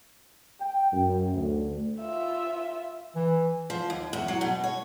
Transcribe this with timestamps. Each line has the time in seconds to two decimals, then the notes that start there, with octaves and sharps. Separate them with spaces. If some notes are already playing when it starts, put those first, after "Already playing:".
0.60 G5
0.92 F#2
1.32 D2
2.01 F4 E5
3.15 E3
3.70 F3
3.90 D#2
4.13 E2
4.28 F#3
4.41 B2
4.64 C#5